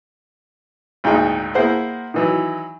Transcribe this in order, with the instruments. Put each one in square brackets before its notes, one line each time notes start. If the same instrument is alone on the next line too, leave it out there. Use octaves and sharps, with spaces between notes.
[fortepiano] G#1 D2 A#2 D#4 G#4 G5
A#3 E4 G#4 C5 F#5
D#3 E3 F#3